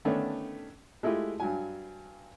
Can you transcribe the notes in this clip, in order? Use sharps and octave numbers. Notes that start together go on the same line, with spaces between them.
D3 D#3 A3 B3 C#4 D4
G#3 A3 E4 F4 G4
G2 F#3 G#5